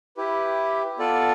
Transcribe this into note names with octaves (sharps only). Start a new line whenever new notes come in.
E4 G4 B4
B3 F4 A4 D5